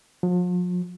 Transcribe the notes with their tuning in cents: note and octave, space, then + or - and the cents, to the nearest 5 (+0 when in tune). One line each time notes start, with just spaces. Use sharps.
F3 +45